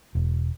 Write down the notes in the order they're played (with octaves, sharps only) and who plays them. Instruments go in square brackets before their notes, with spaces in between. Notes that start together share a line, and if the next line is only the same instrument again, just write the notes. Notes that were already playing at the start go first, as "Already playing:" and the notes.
[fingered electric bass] E1